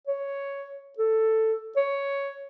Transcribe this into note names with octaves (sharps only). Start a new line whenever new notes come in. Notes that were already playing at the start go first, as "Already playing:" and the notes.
C#5
A4
C#5